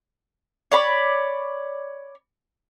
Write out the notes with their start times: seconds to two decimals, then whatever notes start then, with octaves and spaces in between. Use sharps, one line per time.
0.72 C#5 D5 B5